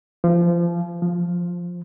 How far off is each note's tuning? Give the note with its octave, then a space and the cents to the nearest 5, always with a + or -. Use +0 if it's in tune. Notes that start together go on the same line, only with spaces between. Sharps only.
F3 -25
F3 +5